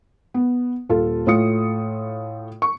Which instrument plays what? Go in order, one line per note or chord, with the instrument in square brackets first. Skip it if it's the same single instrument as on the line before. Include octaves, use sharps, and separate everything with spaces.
[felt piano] B3
D#1 F4 A4
A2 A3 F4 D#6 C#7
C#6